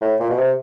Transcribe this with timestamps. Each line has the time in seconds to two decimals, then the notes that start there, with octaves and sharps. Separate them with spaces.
0.01 A2
0.20 A#2
0.30 B2
0.37 C3